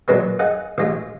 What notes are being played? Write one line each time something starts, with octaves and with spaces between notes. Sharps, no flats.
A#2 F#3 G#3 B3
G#4 D#5 F5 F#5
A1 G#3 F4